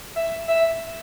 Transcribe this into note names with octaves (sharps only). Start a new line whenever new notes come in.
E5
E5